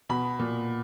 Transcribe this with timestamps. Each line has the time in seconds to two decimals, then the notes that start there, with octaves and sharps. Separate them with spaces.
0.09 B2 B5
0.39 A#2